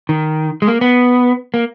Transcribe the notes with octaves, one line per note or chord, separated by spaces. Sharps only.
D#3
G#3
A#3
B3
A#3